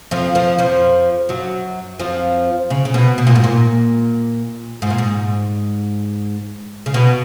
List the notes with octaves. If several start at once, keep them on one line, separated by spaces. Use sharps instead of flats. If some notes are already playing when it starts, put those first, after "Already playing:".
F2 F3
F2 F3
F2 F3
F#2 F#3
F2 F3
C#3
C#3
B2
B2
A#2
G#2
A#2
G#2
A#2
G#2
C#3
B2